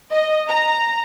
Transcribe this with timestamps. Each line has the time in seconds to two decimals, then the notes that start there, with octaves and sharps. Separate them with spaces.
0.11 D#5
0.49 A#5